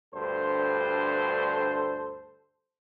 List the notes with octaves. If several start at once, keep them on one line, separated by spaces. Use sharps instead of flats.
D2 G2 A4 C5